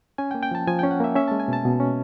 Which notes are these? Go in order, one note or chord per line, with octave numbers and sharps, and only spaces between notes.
C#4 G#5
G5
A#3
G5
F3 A5
F3 G#5
C#4 G5
F#5
A#3 E5
C#4 E5
G#3 A5
G#5
B2 A5
B2
C#4